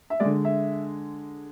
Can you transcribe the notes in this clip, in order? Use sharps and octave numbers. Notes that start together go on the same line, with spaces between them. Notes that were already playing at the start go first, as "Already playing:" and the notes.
E5
D3 G#3 D5
E5